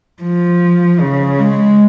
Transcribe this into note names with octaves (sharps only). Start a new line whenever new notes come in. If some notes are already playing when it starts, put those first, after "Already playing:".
F3
C#3
G#3